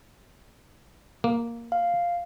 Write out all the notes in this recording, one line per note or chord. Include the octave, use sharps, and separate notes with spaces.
A#3
F5